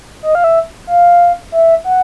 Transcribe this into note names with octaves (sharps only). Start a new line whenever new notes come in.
D#5
F5
E5
F5
E5
F#5